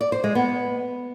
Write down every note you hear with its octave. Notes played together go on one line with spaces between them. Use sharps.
D5
C5
G#3
B3